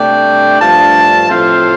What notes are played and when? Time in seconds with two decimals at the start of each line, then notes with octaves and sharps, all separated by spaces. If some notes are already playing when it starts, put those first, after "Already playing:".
Already playing: C3 A3 D4 D5 G5
0.59 G2 F3 A3 D4 F5 A5
1.29 A2 F3 A3 C4 C5 F5